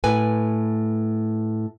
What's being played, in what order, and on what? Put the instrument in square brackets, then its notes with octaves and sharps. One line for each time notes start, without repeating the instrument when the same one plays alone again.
[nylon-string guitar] A2 B4 G#5